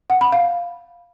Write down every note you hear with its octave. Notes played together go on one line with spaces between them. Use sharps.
F#5
B5
F5